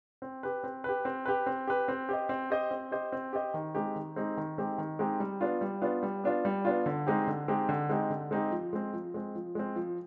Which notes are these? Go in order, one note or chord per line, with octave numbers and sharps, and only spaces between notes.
C4
G4 B4
C4
G4 B4
C4
G4 B4
C4
G4 B4
C4
G4 C5 D#5
C4
G4 C5 D#5
C4
G4 C5 D#5
C4
G4 C5 D#5
D#3
G#3 C4 D#4 G4
D#3
G#3 C4 D#4 G4
D#3
G#3 C4 D#4 G4
D#3
G#3 C4 D#4 G4
G3
B3 D4 F4
G3
B3 D4 F4
G3
B3 D4 F4
G3
B3 D4 F4
D3
G#3 C4 D#4 G4
D3
G#3 C4 D#4 G4
D3
G#3 C4 D#4 G4
D3
G#3 C4 D#4 G4
F3
G#3 C4
F3
G#3 C4
F3
G#3 C4
F3